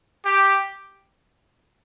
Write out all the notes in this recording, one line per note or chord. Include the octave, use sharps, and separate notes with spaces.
G4